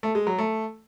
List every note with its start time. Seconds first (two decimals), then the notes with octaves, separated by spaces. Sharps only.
0.03 A3
0.15 G#3
0.27 F#3
0.38 A3